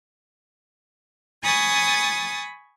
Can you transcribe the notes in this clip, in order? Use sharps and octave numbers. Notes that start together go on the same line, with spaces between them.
G#5 B5 C#6 D#6 A6